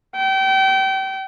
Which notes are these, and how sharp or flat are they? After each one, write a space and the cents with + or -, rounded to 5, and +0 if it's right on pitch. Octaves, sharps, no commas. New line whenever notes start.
G5 -30